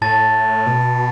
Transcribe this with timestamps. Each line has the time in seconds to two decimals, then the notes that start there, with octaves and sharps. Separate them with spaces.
0.01 A2 A5 A6
0.66 B2